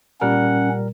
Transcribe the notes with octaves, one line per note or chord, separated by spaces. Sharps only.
A#2 G3 C#4 A#4 F#5